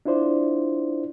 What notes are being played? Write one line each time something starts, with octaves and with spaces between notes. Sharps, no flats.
D4 E4 F4 C5 D5